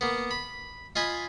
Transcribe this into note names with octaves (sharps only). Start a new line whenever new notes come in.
A#3 B3
B5
F4 D#5 G#5 B5